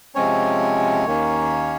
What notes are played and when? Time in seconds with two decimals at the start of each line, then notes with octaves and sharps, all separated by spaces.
0.15 C3 F3 G#3 C4 C#4 C#5
1.06 D#2 D#3 A#3 C#4